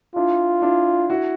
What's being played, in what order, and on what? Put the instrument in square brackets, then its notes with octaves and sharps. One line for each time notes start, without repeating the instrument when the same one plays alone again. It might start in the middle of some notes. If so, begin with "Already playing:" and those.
[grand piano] D4 E4 [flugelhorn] F4
[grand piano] D4 E4
E4 F#4